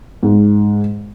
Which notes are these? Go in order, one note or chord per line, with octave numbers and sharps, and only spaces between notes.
G#2